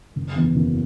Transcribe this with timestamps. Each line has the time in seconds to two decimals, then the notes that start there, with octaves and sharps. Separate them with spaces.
0.16 F#1
0.36 E2 E3 B3
0.55 F#1